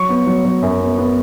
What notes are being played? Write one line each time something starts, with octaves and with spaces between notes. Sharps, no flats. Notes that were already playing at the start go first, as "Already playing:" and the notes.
Already playing: F#3 C#6
B3
F#3
F#3
F#2
B3
B3